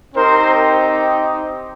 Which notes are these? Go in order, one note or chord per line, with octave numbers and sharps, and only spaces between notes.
C4 D#4 G4 A#4 C5